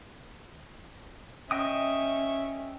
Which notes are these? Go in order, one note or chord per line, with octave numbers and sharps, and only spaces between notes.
C#4 D#5 E5 G5 D#6